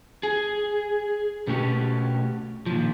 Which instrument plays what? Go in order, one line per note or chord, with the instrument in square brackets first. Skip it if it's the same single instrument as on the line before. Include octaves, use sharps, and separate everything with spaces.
[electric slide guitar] G#4
B2 A3 C#4 F#4 G4
A#2 D#3 F3